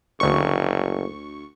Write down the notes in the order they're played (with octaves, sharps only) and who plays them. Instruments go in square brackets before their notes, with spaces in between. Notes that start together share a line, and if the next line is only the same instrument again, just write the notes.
[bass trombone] F#1 [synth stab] D2 C#6